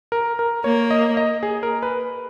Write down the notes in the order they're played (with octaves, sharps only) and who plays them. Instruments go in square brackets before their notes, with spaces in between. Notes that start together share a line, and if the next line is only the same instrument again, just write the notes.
[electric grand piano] A#4
A#4
[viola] A#3 [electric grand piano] C#5
[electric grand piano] D#5
D#5
G#4
A#4
B4